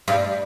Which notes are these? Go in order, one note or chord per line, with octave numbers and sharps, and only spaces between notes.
G2